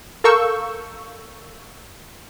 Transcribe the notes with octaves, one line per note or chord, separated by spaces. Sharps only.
A4 A#4 F5 C#6 E6 G6